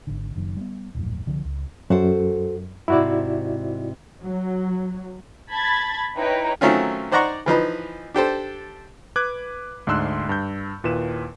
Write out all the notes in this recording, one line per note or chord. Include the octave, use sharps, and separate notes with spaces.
G#1 D3
F#1 F#2 D#3
G3 B3
D#1 A#1 F#2 A2
C2 D3 F3
C#2
F#2 F#4 A4 C5
G#2 C3 E4 F#4 D5
F#3
A5 B5 G#6 A6
D#4 E4 B4 C#5 G5 A#5
D#3 F#3 A3 C4 C#4 F4
D#4 C5 D5 F#5 A#5 C#6
E3 F3 D#4 B4
D4 G4 A4 C5
B4 D6 F#6 G#6
D2 G#2 D4 C6 E6 F#6
G2 G6
D#2 A#2 E4 B4 E7